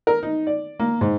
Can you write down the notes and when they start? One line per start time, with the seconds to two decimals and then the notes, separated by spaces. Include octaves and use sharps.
0.07 A#4
0.23 D#4
0.47 D5
0.79 A#3
1.01 G#2